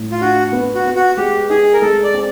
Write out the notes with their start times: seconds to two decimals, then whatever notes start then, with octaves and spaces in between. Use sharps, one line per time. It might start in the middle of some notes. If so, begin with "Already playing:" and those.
Already playing: A2
0.12 F4
0.21 D4 F#4
0.52 B3
0.75 F#4
0.86 B3
0.96 F#4
1.17 G#3 G4
1.50 D#4 G#4
1.73 A#4
1.82 G#3 A4
2.03 D5
2.14 C4